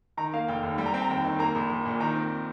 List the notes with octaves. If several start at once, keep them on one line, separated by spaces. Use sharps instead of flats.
D#3 A#5
A#3 F5
F1 G5
D#2
G3 G5
A#5
C4 G5
A#5
D#2 G5
D#3
A#3 A#5
A#1
A#1
A#2
D#3 A#5
C4